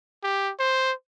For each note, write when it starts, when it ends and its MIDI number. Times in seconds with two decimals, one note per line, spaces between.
0.23 0.52 67
0.59 0.93 72